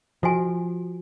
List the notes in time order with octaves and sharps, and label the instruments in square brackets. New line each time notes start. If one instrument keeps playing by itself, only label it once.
[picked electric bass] F3 [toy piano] F4 F#4 G#5